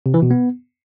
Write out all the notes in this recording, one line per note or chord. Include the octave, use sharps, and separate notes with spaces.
C3
E3
B2
B3